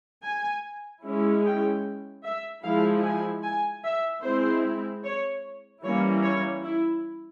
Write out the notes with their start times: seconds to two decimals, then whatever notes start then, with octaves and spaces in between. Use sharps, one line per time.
0.25 G#5
1.05 G#3 C#4 E4
1.45 G5
2.25 E5
2.64 F3 G#3 E4 F5
3.04 G#5
3.44 G#5
3.84 E5
4.24 G#3 C4 E4 C5
5.04 C#5
5.83 E3 G3 A#3 C#4 E4 C#5
6.23 C#5
6.63 E4